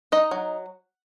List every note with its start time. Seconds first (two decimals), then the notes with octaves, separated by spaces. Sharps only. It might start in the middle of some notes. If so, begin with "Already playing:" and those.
0.12 D#4 D#5
0.31 F#3